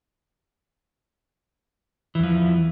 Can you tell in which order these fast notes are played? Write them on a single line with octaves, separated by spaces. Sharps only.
E3 E2 F3